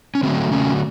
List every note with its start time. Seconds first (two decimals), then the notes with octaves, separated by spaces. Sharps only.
0.15 C#4
0.23 D3 F#3 A3 C4
0.51 D3 F#3 A3 C#4